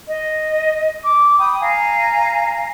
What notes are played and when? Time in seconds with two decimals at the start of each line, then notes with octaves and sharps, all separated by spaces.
0.08 D#5
1.03 D6
1.38 G5 B5 D#6
1.60 F5 G#5 A#5